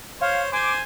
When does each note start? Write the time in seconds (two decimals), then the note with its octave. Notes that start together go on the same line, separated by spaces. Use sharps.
0.21 C5 C#5 F5
0.52 C5 G#5 D6